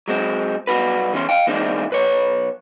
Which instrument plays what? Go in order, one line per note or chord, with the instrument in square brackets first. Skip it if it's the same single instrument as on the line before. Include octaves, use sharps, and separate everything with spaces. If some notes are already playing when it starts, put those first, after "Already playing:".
[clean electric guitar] F#3 G#3 C4
B1 G3 F#4 B4
E2 E3 C#4 C6
F5 G5
E3 G#3 A#3 C4 D4 D#4
B1 B4 C#5